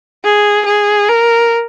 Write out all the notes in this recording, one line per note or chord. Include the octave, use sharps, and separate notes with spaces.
G#4
G#4
A#4